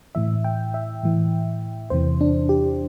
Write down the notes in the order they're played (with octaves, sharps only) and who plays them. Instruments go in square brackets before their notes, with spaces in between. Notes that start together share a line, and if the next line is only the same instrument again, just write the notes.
[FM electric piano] A2 E3 E5
G5
E5
A2 E3
E2 C3 E3 C5
D4
G4